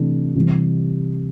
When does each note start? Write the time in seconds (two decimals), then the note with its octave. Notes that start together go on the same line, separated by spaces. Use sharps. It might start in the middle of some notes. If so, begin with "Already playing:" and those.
Already playing: C3 E3 A3 D4
0.35 C3 E3 G3